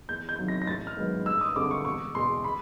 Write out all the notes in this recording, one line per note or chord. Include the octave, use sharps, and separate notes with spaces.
E2 G6
G6
C3 D#3 F#3
A#6
A#6
A1 A6
F6
G#2 D#3 F#3 B3
G2 E6
D#6
D3 G3 C4 D6
C#6
E1 C#6
E2 B2 C6
B5